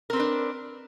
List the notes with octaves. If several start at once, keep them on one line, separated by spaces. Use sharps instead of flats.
C4 D4 A#4 B4